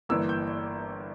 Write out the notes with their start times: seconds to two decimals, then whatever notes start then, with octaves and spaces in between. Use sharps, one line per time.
0.09 G1 G2 E3 A#3 E6
0.29 G6